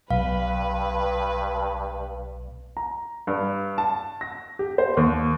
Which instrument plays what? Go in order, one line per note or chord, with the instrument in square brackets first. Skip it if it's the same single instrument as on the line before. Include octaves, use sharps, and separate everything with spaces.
[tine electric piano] B1 [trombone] G2 [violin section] B4 [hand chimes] F5
[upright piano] A#5
G2
A5
A#6
G4
C5
D#2